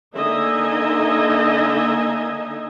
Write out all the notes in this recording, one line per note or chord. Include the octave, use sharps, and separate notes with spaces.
D3 A#3 D#4 D#5 E5 G#5